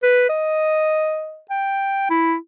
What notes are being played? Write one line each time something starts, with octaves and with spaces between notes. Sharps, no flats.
B4
D#5
G5
E4